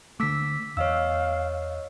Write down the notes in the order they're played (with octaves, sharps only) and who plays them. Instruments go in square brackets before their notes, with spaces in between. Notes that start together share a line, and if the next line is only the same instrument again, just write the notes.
[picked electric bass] D3 A3 [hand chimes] D6 E6 B6
[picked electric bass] E2 [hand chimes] C#5 D#5 E6 [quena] F5